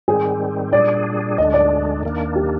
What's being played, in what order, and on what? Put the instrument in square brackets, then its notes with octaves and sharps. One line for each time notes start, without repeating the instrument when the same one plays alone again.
[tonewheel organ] G#2 D#3 G3 C4 [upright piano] G#4
[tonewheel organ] A#2 G3 D4 G#4 [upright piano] D5
[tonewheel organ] D2 D3 G#3 D4 [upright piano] D#5
[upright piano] D5
[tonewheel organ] D#2 D#3 A#3 D4
[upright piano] G4